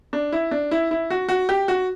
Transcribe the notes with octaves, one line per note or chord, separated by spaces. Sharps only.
D4
E4
D4
E4
E4
F#4
F#4
G4
F#4